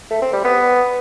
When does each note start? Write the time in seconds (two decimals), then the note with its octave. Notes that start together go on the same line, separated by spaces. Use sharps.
0.10 A3
0.22 C4
0.33 G3
0.44 B3